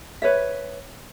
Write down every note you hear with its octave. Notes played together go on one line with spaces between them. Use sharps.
B4 C#5 E5